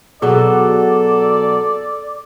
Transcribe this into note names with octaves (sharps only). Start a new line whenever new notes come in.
B2 F#3 G#4 A4 D5